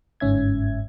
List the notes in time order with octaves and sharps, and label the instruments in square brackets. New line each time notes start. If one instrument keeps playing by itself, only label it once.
[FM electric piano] G1 G#2 C#4 E5 G#6